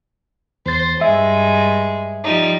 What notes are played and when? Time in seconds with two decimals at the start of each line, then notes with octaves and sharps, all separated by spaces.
0.66 E2 C5 A6
1.01 G2 G#3 E5
2.24 F3 G3 D#4